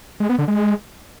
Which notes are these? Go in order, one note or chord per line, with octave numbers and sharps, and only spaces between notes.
G#3
B3
D3
G#3